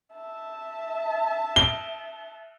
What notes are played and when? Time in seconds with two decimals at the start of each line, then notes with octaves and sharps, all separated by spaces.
0.14 E5 A5
1.56 G7